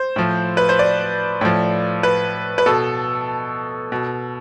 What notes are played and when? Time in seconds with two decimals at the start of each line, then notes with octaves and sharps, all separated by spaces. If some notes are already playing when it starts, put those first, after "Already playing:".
Already playing: C5
0.16 A2 F3
0.57 B4
0.69 C5
0.79 D5
1.41 A2 F3
2.03 B4
2.58 B4
2.66 B2 A4
3.92 B2